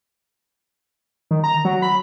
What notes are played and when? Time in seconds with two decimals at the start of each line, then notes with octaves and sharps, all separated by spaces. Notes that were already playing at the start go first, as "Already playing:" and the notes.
1.31 D#3
1.44 A#5
1.65 F#3
1.82 B5